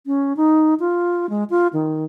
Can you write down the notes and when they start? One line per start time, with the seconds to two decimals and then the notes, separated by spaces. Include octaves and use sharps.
0.06 C#4
0.37 D#4
0.80 F4
1.30 G#3
1.50 F4
1.73 D#3